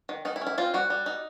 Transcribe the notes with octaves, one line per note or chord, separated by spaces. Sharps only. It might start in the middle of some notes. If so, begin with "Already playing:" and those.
D#3
D#3 D#4
E4
C#4
E4
C4 F4
G3 F#4
G3
D#4